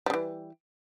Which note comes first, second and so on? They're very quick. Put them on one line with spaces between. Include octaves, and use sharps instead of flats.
G3 C#3 E3